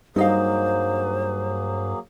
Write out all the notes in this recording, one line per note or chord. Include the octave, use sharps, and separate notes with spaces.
G2 F#3 A#3 D#4 G#4 C5 D#5 F5